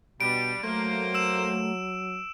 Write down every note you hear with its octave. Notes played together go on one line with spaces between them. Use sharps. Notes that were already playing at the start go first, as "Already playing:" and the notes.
B2 G3 D4 D7
F#3 A3 A#3 C5
E6 E7